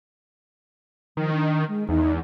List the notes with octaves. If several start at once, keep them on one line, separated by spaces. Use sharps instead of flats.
D#3 F3
D4
G#3
E2 D#4